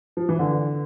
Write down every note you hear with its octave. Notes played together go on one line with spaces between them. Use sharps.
F3
E3
D3